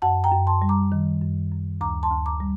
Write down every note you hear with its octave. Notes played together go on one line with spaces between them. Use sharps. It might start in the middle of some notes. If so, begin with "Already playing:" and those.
F#2 F#5 A5
G5 A#5
F#2
A5 C6
G3
A#5 D6
D#3
F#2
F#2
D2 A#5 D6
A5 C6
D2
A#5 D6
G3